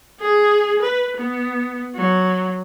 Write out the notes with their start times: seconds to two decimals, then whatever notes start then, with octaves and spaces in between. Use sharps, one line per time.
0.20 G#4
0.82 B4
1.16 B3
1.95 F#3